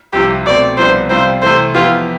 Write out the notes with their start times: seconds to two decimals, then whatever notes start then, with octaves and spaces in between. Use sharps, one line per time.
0.13 C2 C3 F3 G4
0.45 B2 A3 C4 D5
0.77 C2 C3 F3 B3 D4 C5
1.10 C3 G3 C4 F4 C5
1.42 C3 E3 A3 C5
1.75 F2 E3 B3 E4 F4 G4